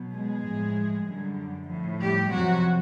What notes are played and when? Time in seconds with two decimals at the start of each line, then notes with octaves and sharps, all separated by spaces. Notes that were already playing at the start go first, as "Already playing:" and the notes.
Already playing: B2 F#3
0.14 G#3 G#4
0.45 A2 F3
1.07 F#2 D3 G3
1.69 A2 F3
2.00 G3 G4
2.30 F2 C3 F3 F#3 F#4